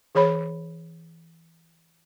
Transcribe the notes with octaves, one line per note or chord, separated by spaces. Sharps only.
E3 G#4 C#5 B5